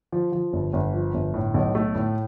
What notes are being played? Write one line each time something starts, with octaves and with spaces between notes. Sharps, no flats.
F3
F3
G1
G1
F3
G1
A2
B1
A3
A2